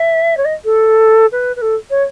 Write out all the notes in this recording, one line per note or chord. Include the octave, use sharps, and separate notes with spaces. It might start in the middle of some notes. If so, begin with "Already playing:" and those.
Already playing: E5
C#5
D#5
A4
B4
B4
A4
C#5